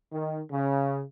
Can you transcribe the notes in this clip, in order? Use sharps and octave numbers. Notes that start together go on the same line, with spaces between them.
D#3
C#3